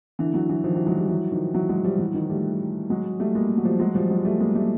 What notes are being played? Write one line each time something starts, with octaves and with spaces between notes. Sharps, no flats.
D3 E3
E3 F#3
E3 F#3
D#3 F3
E3 F#3
F#3 G#3
F3 G3
E3 F#3
D#3 F3
E3 F#3
F#3 G#3
F3 G3
E3 F#3
D#3 F3
G3 A3
F#3 G#3
G3 A3
G#3 A#3
F#3
F3 G3
F#3 G#3
F3 G3
F#3 G#3
G3 A3
G#3 A#3
G3 A3